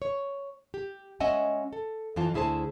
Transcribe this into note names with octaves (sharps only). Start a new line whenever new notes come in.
C#5
G4
G#3 C#4 D#5 E5 F#5 G#5
A4
F2 E3 F4 A5
D2 E4 G#4 C5 A5